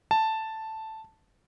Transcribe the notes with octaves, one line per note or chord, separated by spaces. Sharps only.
A5